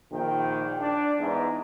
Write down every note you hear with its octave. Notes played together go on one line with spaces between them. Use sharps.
A#1 A#2 D#3 G5
D4 D5
E2 G#2